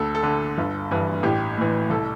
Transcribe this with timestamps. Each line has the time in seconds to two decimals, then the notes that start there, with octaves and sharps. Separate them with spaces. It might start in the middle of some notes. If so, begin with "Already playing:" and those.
Already playing: D2 A4
0.15 A4
0.23 D3
0.58 G1
0.91 G2 E3
1.23 A1 G4
1.58 A2 E3
1.90 C2 A4